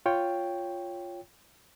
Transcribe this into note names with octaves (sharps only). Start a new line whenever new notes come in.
F4 C#5 G5